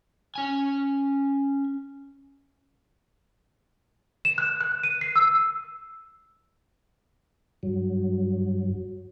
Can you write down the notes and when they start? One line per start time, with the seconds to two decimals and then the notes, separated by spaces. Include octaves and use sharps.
0.35 C#4 G#5
4.25 E7
4.38 F#6
4.61 F#6
4.83 D#7
5.01 C7
5.16 E6
7.63 G2 F#3